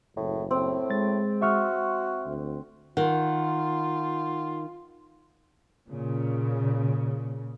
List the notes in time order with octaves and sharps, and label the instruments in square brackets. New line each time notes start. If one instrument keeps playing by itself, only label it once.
[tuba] F#1 [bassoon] A2
[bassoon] A2 [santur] C4
[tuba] G#3 [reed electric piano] A6
[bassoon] F#4 [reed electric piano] E5 C#6 F6
[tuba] D2
[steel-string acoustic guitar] D#3 [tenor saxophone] F4 [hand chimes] F#5
[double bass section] A#2 C#3